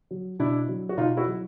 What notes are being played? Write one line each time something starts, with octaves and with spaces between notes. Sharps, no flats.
F#3
B2 D4 E4
F#3
F#4
B2 D#4 F4
E4 F#4
F#3